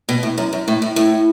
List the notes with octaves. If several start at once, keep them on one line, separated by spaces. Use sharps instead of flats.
B2
A2
F#2
F#2
A2
A2
A2